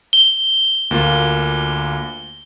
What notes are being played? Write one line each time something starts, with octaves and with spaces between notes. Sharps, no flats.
G7
D2 A#3 F4